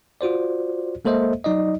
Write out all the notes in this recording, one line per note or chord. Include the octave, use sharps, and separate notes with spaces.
F4 F#4 C5 D5
G#3 A#3 A4 C5 D#5 E5
F#3 D#4 D5 D#5